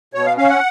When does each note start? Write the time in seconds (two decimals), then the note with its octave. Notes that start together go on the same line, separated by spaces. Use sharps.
0.14 B2 C#5
0.26 F5
0.37 C#4 F5
0.49 F#5